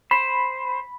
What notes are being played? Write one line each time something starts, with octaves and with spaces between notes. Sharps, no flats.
C5 B5